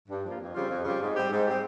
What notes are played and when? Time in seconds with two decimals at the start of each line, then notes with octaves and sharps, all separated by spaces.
0.09 G2
0.24 F3 A#3 F4
0.39 F2
0.54 C#3 G3 C4 F4
0.69 F2
0.84 C#3 G3 C4 F4
1.00 G#2
1.15 G3 C4 G4
1.31 G#2
1.45 G3 C4 G4